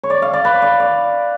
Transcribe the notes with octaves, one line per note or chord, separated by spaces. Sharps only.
C#5
D5
F5
D5
B4
D5
D5